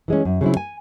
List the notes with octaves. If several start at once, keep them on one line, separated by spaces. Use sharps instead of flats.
E3 G#3 C#4
F#2
C#3 F#3 C4 E4
G#5